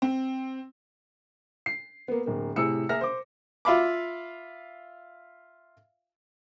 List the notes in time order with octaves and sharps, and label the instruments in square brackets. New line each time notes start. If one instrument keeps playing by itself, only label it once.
[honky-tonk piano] C4
[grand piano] C7
A#3 B3
D1 A#3
A2 C3 E4 G#4 E6 C#7
A#3 G#4 A#4 E5 F6 A#6
C5 D6
[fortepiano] F4 E5 F5 B5 D6